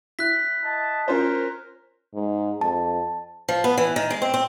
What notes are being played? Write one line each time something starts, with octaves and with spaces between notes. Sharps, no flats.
E4 F#6 B6
D#5 A5
C#4 F4 A#4 C5
G#2
F2 A5
F3
B3
E3
D#3
G#3
C4
C4